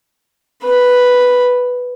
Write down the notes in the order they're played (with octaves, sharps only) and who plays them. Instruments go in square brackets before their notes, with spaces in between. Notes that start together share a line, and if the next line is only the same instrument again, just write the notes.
[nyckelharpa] B4 B5